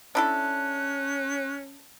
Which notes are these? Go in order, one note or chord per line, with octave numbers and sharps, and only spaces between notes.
C#4 D4 E4 A4 F#6